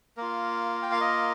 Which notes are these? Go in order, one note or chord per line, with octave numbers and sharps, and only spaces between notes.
A#3 F4 A#4
G5
F5
A#4 D#5